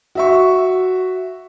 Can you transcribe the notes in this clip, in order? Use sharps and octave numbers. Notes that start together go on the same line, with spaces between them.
F#4 E5 C#6